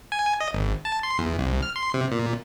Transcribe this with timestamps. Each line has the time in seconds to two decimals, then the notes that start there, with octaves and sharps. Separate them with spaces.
0.12 G#5
0.41 D#5
0.53 G#1
0.85 A5
1.03 C6
1.18 E2
1.39 C2
1.63 F6
1.76 C6
1.94 C3
2.12 A#2